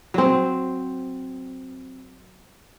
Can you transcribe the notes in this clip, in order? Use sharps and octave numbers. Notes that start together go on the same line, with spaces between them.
F#3 C4